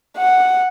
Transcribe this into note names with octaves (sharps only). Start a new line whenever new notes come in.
F#5